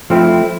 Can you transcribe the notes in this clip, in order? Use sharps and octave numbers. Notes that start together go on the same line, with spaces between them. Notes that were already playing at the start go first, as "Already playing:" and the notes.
F3 A3 C4 E4